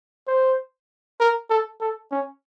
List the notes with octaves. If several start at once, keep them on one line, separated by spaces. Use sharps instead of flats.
C5
A#4
A4
A4
C#4